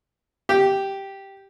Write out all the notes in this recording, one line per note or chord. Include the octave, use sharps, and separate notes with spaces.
G4